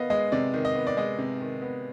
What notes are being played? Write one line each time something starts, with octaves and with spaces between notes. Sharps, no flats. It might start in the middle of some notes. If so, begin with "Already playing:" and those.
Already playing: D#3 B3 D#5 F5
G#3 D#5
C3 D5
D#3
D#5
B3
D5
G#3 D#5
C3
D#3
B3